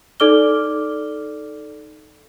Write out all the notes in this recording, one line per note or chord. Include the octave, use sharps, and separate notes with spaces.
D#4 A4 D5 D6 F6 G7